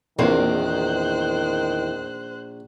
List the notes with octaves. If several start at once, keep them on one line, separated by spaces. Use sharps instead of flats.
A#1 E2 D#3 A#3 C4 C5 F#6